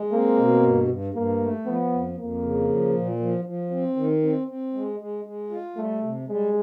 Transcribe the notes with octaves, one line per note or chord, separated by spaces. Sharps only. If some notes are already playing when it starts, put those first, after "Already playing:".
Already playing: G#3
A#3 C4
B2
G2
G2
G2 A#3
A3
F3 B3
F2
F2 A#3
C#3
F3
A#2
F3
F3
C4
D#3
C4
C4
G#3
G#3
G#3
F4
G3 A3
C3
G3 G#3